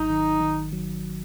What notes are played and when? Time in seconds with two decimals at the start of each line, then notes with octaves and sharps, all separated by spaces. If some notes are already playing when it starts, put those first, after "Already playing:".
Already playing: G#1 F#3 D#4
0.10 D#3
0.41 D#3
0.73 F#3